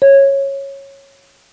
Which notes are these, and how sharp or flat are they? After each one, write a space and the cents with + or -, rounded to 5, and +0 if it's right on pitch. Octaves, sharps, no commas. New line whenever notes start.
C#5 -10